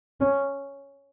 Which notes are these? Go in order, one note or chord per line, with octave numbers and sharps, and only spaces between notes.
C#4